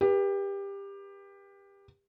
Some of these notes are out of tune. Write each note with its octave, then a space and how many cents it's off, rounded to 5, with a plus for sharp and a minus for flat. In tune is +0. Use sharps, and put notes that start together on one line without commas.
G4 +20 B4 -35